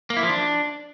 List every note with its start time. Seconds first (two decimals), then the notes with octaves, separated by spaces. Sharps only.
0.10 A#3
0.17 E4
0.23 F3
0.29 D4